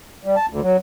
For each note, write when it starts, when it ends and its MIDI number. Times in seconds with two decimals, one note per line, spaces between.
0.25 0.36 55
0.36 0.46 81
0.49 0.61 38
0.62 0.77 54